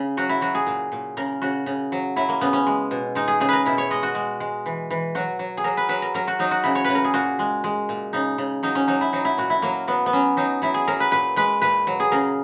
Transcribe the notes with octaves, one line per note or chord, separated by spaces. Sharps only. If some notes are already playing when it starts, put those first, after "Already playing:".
Already playing: C#3
F#3 F#4
E4
F#3 F#4
G#4
A#2
A#2
C#3 A#4
C#3 F#4
C#3
F#3
F#3 E4
A#3
C#3 B3
C#4
G#3
B2
G#3 D#4
G#4
C#3 G#4
A#4 B4
B2 E4
C#5
G#3 D#5
F#4
G#3
G#3
E3
E3
F#3 F#4
F#3
G#4
F#3 A#4
B4
F#3 B4
A#4
F#3 A#4
F#4
F#3 D#4
F#4
C#3 E4
C#5
C#3 B4
A#4
G#4
A#2 F#4
G#3
G#3
A#2
C#3 D#4
C#3
F#3 D#4
C#4
F#3 D#4
E4
F#3 D#4
E4
A#2 F#4
E4
F#3 A#3
F#3 B3
B3
F#3 C#4
F#3 D#4
F#3 E4
G#4
F#3 A#4
B4
A#2 B4
G#3 B4
A#2 B4
F#3
G#4
C#3 A#4